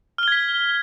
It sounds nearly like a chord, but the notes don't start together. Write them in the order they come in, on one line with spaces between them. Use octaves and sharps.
F6 G7 G#6 B6